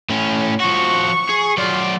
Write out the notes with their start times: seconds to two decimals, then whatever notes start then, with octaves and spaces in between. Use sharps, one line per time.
0.10 A2 C#4
0.60 F3 F#4 C#6
1.29 G#4
1.57 F#3 F4 D5